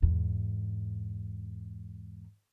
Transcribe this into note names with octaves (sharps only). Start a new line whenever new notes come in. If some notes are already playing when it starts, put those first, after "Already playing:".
E2 G#2